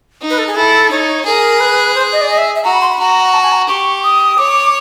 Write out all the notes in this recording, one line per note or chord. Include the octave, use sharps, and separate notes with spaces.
D#4
B4
A4
G#4
E4 A4
D#4 C#5
G#4 A#4
B4
C5
D#5
D5
D#5
E5
E5
F#4 A#5
B5
C6
B5
F#4 A#5
A5
G#5
A#5
G4 C#6
D#6
C#5 D6